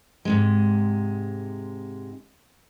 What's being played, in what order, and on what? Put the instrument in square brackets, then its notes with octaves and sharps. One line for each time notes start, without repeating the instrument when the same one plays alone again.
[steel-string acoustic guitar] G#2 C3 G#3